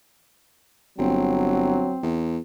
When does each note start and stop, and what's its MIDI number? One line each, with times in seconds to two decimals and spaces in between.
0.98 1.90 31
0.98 1.99 54
0.98 2.20 60
2.03 2.39 40